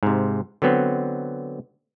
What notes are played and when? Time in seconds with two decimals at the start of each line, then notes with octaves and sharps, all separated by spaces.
0.03 G#2 C3
0.62 D3 F#3 B3 C4